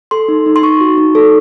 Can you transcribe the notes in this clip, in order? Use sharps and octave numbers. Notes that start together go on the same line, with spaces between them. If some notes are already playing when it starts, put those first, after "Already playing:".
A4 C6
D#4
D#4
C6
D#4 C#6
F#4
D#4
A4